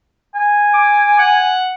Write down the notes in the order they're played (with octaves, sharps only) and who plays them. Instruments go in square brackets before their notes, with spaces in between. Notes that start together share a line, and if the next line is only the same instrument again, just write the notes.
[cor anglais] G#5
[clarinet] D6
F#5